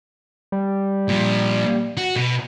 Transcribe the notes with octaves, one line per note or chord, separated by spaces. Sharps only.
G3
A#2 F3
F#4
B2